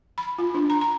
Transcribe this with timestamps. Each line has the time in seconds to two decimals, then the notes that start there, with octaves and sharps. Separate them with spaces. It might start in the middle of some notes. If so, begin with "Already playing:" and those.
0.18 B5
0.39 F4
0.55 D4
0.70 A#5
0.81 A#5